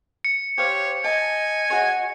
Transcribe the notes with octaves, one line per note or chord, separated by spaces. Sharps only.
C#7
G4 C5 C#5 F5
D#5 G#5 A5
F#4 G#4 C#5